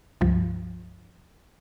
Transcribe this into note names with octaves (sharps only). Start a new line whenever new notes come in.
C#2 G2 F3